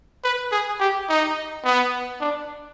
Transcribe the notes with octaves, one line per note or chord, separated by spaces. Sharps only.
B4
G#4
G4
D#4
B3
D4